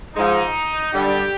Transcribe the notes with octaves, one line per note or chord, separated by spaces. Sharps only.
G#2 F3 G#3 D#4
G2 D3 G3 G4